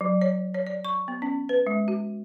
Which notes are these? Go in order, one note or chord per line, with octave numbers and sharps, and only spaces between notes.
F#3
C#5
C#5
D5
C#6
B3
C#4
B4
G#3
F#4